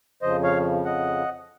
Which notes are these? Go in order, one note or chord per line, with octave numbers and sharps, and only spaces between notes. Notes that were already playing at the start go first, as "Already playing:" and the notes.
F2 C#3 F3 C5 D#5
C#5 F5
D#5 F#5